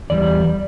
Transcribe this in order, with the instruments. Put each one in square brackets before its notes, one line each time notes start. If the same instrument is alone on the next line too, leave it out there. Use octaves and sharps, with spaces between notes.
[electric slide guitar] E2 E3 G3 D5